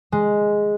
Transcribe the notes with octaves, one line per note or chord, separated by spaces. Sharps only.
G#3